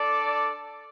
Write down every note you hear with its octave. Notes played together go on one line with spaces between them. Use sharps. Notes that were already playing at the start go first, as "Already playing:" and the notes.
Already playing: D4 A4 D5